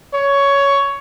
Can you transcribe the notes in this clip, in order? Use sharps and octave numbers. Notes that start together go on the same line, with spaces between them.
C#5